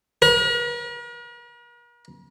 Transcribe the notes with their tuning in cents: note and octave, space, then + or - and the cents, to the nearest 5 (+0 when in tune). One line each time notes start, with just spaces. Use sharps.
A#4 +45